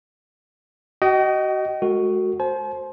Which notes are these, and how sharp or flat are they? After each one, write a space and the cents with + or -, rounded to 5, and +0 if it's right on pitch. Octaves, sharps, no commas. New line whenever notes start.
F#4 +30 D#5 +0 G5 -40
G#3 +25 F#4 +0 A4 +45
C5 +10 A5 -45